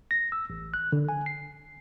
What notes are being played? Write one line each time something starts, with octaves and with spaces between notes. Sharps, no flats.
A#6
E6
A1
F#6
D3
G#5
C7